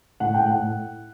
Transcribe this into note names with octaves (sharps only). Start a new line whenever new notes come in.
A2 F#5
A2 G5
F#5
A2